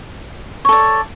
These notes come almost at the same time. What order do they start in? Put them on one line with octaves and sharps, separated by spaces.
C#5 A4 D5